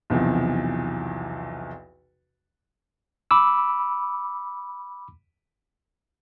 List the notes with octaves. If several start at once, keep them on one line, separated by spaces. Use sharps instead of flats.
B1 E2 C3 F3
B5 D6 E6